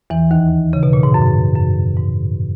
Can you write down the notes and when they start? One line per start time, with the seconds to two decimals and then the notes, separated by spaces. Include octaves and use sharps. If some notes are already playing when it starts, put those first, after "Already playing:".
0.10 E2 E3
0.31 D#2 D#3
0.73 C#3
0.83 B2
0.93 A#2
1.03 G#2
1.14 F#2
1.56 F#2
1.97 G#2